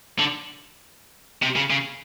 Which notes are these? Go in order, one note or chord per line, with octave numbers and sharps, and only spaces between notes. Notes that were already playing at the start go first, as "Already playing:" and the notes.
D3
C3
C#3
C#3